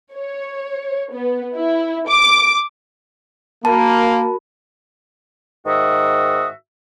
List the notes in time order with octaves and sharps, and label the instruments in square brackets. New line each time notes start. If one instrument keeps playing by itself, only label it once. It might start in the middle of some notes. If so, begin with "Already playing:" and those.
[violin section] C#5
B3
E4
D6
[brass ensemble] A#3 [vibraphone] F#4 A#4 B5 [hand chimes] A5
[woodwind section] G#2 D#3 F#4 E5 D#6